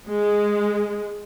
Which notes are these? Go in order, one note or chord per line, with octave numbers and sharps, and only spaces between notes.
G#3